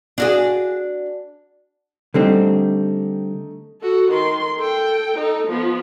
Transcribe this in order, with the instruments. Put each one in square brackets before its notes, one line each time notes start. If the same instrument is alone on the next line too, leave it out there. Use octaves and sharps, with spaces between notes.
[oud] D4 F#4 G#4
[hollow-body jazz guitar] D3 G3 C4 [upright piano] A3 D#4
[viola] F#4 A4
D#3 C6
A4 G5
D#4 A4
F3 B3